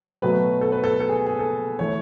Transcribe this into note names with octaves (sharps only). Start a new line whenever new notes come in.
B2 F#3 A3 B4
A4
B4
A4
A4
G#4
G#4
A4
E3 A3 C#5